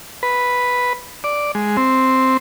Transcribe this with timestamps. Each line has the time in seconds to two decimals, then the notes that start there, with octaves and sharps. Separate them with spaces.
0.23 B4
1.24 D5
1.55 G#3
1.77 C4